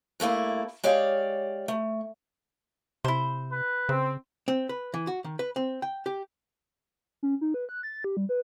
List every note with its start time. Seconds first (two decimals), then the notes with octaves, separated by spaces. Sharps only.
0.20 G2 A3 A#3 E4
0.84 G#3 G4 C#5 D5 F5
1.68 A3
3.04 C3 E4 C5
3.52 B4
3.89 C#3 C4
4.48 C4
4.69 B4
4.94 E3
5.07 F#4
5.24 D#3
5.39 B4
5.56 C4
5.82 G5
6.06 G4
7.23 C#4
7.41 D#4
7.54 B4
7.69 F#6
7.83 A6
8.04 G4
8.17 G3
8.29 B4